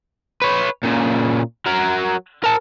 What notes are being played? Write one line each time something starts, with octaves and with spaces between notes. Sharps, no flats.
B4 C#5
A#2 C#3
F#3 A#4
A#4 A5